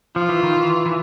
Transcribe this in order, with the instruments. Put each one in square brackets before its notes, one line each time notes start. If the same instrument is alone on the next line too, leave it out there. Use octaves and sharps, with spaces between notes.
[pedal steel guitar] F3 [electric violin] F4
[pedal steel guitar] E3
D#3
E3
E3